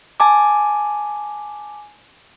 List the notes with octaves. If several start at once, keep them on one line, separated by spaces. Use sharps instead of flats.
G#5 A5 D6